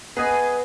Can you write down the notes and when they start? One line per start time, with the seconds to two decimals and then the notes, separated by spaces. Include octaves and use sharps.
0.16 B3 G#4 B4 D#5 G#5